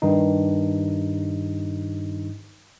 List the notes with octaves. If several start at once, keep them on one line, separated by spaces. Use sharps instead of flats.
G2 D#3 D#4